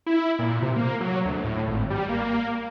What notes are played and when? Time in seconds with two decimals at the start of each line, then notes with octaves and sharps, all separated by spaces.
0.06 E4
0.39 A#2
0.62 C3
0.76 A#3
1.01 F#3
1.25 D2
1.44 A2
1.67 G#1
1.90 G3
2.09 A#3